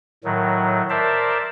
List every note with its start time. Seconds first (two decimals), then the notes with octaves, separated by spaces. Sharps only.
0.24 A2 D#3 F#3
0.90 A#4 C5 D5 E5 A5